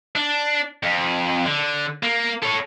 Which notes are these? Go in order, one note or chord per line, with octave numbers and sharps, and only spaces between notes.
D4
F2
D3
A#3
A4 C#5